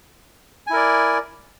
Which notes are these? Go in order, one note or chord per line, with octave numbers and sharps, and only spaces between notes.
E4 A#4 D5 G#5